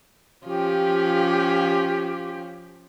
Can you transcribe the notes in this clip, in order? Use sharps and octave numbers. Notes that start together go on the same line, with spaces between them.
F3 C#4 F4 G4